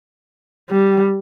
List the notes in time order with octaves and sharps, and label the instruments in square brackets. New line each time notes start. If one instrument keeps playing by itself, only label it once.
[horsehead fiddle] G3